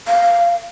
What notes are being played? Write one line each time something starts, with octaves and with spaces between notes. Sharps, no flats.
F5